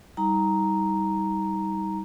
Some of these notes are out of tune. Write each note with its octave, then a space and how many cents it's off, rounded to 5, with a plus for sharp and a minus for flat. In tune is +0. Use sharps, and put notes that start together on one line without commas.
G3 +0 D#4 +30 A#5 +0